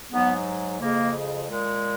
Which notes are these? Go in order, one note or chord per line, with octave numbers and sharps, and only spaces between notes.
G#2 F#3 B3
F2 C#3 G#3 A#3
A#2 G#3